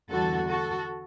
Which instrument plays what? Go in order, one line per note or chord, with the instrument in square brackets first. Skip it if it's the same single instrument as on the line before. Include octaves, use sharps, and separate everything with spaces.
[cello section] E2 D3 G3 F#4 A4
F#4 A4